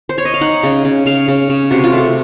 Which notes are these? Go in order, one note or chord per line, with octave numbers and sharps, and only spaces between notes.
C5
C#5
D#5
F5
D#4 F#5
C#3
C#3
C#3 F5
C#3
C#3
C3 F#4
F4
A3 F#4